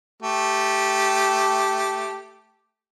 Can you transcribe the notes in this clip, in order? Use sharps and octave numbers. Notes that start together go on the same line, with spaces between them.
A3 G4